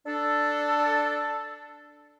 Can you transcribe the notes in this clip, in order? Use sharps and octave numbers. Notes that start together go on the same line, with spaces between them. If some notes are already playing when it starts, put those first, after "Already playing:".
D4 A4